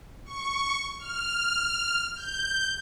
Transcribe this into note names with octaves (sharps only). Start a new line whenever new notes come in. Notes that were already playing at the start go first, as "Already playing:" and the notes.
C#6
F6
G6